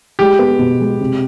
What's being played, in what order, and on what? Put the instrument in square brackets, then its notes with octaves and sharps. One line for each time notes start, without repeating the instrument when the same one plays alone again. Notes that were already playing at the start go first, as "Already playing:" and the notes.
[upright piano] G#3 [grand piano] G4
[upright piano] B3
B2
G#3
C3